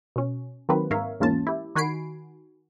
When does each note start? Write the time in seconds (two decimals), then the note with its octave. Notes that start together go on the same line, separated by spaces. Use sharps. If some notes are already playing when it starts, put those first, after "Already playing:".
0.16 B2 C#4
0.69 D#3 F#3 A#3 C4 B4
0.91 G#2 A#4 C#5 E5 F5
1.20 E2 G#2 A#3 C#4 F4 A5
1.47 E4 G4
1.75 D#3 F#4 G#5 B5 C7 D7